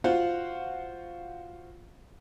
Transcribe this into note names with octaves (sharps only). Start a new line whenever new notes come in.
F4 F#4 C5 F5 F#5